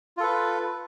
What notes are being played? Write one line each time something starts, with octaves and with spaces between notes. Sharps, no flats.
F4 A4 B4